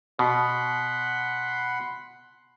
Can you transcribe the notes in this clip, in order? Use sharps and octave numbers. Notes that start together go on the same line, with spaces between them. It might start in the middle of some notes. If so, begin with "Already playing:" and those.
B2 F#5 B5 C6